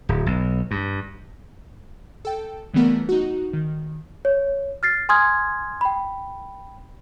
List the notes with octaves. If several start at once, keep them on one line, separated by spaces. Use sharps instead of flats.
D1
B1
G2
A4 G5
C#3 E3 G3 A3 B3 A#4
D#4 F#4
D#3
C#5
F6 A6 C7
G#5 C6 D#6 F6 G#6
G5 B5